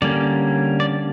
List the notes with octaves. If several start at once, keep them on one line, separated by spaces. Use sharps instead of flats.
D3 G3 A#3 C#4 D5
D5